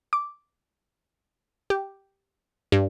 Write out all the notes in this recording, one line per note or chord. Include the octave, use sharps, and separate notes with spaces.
D6
G4
G2